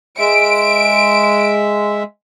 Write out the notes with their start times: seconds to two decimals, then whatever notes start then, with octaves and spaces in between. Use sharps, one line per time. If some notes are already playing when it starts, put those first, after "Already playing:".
0.19 G#3 E5 D7